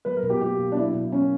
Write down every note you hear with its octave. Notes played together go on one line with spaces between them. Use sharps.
F#3 B4
A#4
B2
G4
A#3 G4
B2
D4
F#3 E4
B2
A#3 C#4